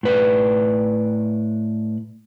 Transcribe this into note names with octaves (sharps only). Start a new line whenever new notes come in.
A2 B4 D5